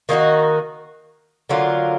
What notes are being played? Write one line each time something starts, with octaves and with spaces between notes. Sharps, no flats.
D#3 A#3 D#4 F#4
D3 F#3 A#3 F4